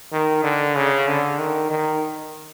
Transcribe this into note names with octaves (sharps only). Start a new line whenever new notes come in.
D#3
D3
C#3
D3
D#3
D#3